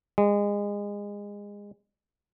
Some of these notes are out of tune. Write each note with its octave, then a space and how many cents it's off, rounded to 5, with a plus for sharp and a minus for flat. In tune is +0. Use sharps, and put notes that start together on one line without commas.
G#3 -25